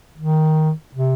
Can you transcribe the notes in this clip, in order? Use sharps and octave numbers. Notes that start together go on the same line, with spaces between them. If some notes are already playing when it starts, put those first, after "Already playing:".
D#3
C3